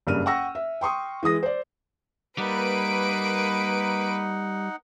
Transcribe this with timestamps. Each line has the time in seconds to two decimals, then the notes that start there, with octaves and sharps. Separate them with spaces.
0.07 F#1 G2 F6 D#7
0.26 F#5 G5 C#6 E6 A#6
0.55 E5
0.81 G5 C6 C#6 D#6
1.23 E3 G#3 D#6 A#6
1.43 C5 D5
2.38 G3 A#3 D#4 B4 F#5 D7